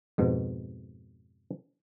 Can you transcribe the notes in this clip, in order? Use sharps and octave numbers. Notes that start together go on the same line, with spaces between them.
F2 G#2 B2